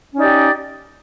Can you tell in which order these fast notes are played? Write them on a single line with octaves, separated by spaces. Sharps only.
C#4 D#4 D5 G4